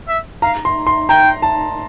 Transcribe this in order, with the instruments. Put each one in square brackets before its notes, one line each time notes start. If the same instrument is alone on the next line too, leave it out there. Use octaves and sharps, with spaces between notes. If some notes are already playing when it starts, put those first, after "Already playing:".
[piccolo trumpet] E5
[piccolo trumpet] F5 [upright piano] A#5
[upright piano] C6
C6
[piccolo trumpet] G5 [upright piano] A#5
[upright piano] A5